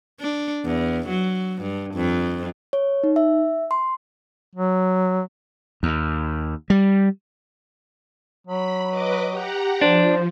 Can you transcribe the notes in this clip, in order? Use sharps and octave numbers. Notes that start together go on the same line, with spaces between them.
D4
E2
F#3
G2
F2
C#5
D#4
E5
C6
F#3
D#2
G3
F#3 B5
B4 D#5 D6
G4 F#5 A#5
F3 D4 C5